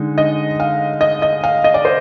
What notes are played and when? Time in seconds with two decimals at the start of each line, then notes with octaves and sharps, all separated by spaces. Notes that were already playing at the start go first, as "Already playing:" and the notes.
Already playing: D3 G#3 D#4
0.18 D#5
0.60 F5
1.01 D#5
1.22 D#5
1.44 F5
1.64 D#5
1.74 D5
1.85 C5